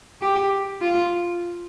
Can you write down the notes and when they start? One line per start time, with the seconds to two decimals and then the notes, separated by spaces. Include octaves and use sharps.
0.22 G4
0.81 F4